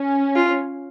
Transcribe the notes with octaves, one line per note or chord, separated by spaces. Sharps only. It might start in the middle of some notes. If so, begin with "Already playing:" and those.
Already playing: C#4
F4